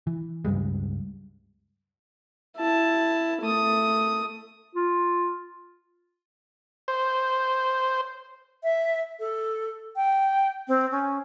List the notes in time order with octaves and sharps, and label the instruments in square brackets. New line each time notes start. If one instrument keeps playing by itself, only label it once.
[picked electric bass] E3
C#2 G2 G3 G#3
[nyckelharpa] E4 A5
A3 D#6
[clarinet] F4
[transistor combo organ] C5
[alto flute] E5
A4
G5
C4
C#4